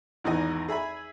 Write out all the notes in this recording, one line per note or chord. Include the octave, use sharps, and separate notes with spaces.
G#1 E2 E3 D#4 D#5 G#5
G#4 E5 G#5 B5